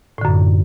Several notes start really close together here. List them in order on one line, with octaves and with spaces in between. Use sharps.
A2 D3 F#2